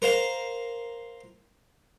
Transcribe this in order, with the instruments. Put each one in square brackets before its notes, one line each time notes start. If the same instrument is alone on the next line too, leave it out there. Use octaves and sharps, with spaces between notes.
[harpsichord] A#4 C5 F5